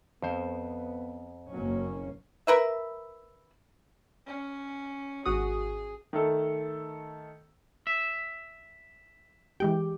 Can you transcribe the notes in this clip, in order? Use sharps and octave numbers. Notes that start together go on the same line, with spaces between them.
F2 B3 C5
F#1 F#3 A#3 C#4
A#4 B4 E5
C#4
G#1 F#4 G#4 D#6
D#3 A3 A4
E5
E3 G#3 G4 G5